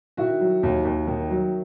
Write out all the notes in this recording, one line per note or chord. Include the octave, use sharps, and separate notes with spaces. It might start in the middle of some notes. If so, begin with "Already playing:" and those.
D#3 E4 F#4
F#3
D#2
D#2
D#3
F#3